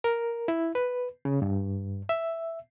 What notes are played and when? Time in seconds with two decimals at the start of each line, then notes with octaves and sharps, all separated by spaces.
0.04 A#4
0.48 E4
0.75 B4
1.25 C#3
1.42 G2
2.09 E5